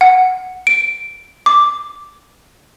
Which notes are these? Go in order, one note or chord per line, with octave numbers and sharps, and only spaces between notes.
F#5
D7
D6